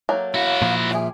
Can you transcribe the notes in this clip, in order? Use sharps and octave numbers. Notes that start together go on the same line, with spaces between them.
F#3 A3 A#3
E4 F#4 F5
A#2 F3
G3 G#4 E5